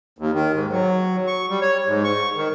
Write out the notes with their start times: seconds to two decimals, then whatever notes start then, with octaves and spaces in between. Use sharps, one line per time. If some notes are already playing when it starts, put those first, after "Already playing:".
0.18 D#2
0.34 D#3
0.54 G#2
0.71 F#3
1.27 C#6
1.50 G3
1.62 C#5
1.87 G#2
2.04 C#6
2.36 D#3